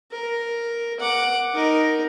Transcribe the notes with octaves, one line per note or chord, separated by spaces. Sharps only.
A#4
F#5 D6
D#4 A#4